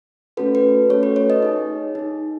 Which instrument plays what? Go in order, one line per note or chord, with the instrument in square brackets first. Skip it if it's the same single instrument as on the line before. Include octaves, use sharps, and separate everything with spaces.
[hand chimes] A3 C#4 F#4 A4 B4
B4
A3 C#4 F#4 A4 C#5
B4
C#5
D#5
D#4 G#4
D#4 G#4